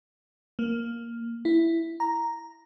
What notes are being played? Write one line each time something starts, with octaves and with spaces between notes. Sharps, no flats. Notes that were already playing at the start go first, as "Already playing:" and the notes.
A#3
E4
A#5